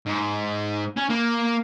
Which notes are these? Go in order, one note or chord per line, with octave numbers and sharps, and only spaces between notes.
G#2
C#4
A#3